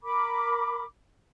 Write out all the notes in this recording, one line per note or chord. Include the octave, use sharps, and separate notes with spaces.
A#4 B5 D6